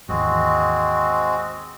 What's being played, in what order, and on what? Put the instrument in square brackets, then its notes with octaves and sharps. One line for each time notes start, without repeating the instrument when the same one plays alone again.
[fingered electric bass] G#1 D#2 E3 [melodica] G#3 C4 F#4